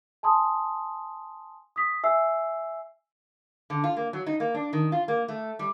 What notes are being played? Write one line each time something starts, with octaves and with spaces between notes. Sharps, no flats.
G#5 A5 C6 D#6
D#6 B6
E5 G#5 E6 C7
D3
F4
A#3
F#3
D#4
A#3
D4
D#3
F4
A#3
A3
G3